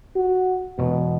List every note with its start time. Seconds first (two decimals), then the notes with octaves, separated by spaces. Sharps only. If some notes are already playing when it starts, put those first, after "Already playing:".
0.16 F#4
0.78 E1 B2